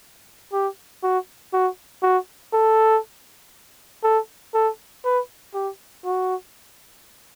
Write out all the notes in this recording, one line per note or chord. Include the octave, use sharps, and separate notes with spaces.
G4
F#4
F#4
F#4
A4
A4
A4
B4
G4
F#4